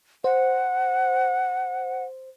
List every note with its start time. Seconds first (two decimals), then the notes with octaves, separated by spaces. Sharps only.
0.24 C5 F#5